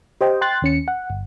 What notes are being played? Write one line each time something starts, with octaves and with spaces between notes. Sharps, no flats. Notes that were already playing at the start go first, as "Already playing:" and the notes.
G4 C5 D#5 G5
G5 C6 F#6 A6
D#2 C#4 C#7
F#5
G1